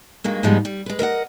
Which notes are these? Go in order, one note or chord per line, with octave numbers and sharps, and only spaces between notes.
G2 F#3 G#3 A#3
G#2 F3 G3 G#3 B3 D#4
G3
G#3 B4
A#4 D#5 E5 F#5